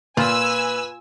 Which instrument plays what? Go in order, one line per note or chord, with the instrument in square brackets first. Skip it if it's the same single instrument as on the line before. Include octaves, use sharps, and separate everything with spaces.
[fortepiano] A#2 [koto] F4 [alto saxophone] B4 [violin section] G#5 E6